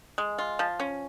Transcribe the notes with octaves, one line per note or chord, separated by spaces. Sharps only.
G#3
F4
F3
C#4